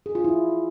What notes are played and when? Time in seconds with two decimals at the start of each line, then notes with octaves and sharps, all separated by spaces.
0.06 G#4
0.15 F4
0.24 E4